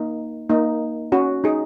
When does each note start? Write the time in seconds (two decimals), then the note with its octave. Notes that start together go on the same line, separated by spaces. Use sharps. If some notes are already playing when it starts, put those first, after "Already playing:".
Already playing: A#3 D#4
0.50 A#3 D#4
1.12 C#4 F#4
1.44 D#4 G#4